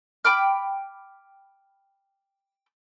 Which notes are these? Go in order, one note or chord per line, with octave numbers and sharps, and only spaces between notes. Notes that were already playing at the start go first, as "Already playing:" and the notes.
G5 B5 D6 F6